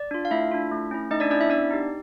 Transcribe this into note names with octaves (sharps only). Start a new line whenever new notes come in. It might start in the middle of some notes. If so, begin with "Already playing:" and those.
Already playing: D5
D4 F4
F5
A3 E4 E5
D4 F4
A3
C#4 E4
A3 D#4 D#5
D4 D5
C#4 D4 E4 D5
E4 E5
B3 D4 D5
D#4 G4